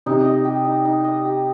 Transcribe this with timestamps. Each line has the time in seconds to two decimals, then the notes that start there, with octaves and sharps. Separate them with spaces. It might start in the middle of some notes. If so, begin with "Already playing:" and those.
0.06 C3 D#4
0.26 D#5
0.45 G4
0.65 D#4
0.85 D#4
1.04 D#5
1.25 G4